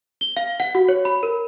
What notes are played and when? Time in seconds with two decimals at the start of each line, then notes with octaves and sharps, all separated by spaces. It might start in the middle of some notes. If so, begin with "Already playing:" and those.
0.21 G7
0.37 F5
0.60 F#5
0.75 F#4
0.89 C#5
1.05 B5
1.23 A#4